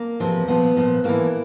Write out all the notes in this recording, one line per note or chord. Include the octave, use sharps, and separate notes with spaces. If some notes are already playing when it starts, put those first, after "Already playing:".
Already playing: A#3
E2 C3 F3
A#2 F3 B3
A#2 F3
A2 E3 A#3